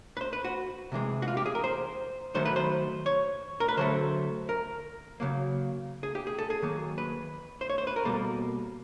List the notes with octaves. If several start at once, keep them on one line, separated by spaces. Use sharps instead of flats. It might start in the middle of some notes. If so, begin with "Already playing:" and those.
B4
C5
B4
F#4
C3 E3 G#3
F#4
F4
G4
G#4
A#4
C5
D#3 F#3 A3 C5
B4
C5
C#5
A#4
B4
D3 F#3 A3 C5
A#4
C#3 F#3 A#3
G#4
G4
G#4
A4
G#4
D#3 F#3 A#3
B4
C5
C#5
C5
B4
A#4
B2 G3 A#3 A4